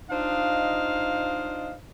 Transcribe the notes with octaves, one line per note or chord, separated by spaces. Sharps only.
D4 D#4 F4 C5 D#5 F5